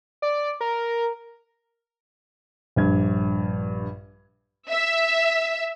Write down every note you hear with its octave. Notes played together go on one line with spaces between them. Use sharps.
D5
A#4
A#1 G2 G#6
E5